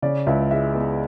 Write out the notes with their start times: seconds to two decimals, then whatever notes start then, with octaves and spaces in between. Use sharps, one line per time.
0.02 C#3 D5
0.27 C#2 E5
0.51 G#3 E5
0.74 B3